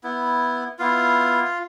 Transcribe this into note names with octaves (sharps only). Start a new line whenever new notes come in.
B3 E4
B3 E4 F4 F5